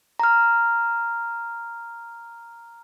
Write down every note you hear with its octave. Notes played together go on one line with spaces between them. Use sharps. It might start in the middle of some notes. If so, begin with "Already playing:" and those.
A#5 F6